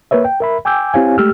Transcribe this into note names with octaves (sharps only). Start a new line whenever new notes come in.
A#3 A#4 B4 C#5 E5
G5
A#4 E5 B5
G5 G#5 D6 E6 G6
C4 E4 G4 C#5 F5 G#5
G#3 A3 G4 E6 F6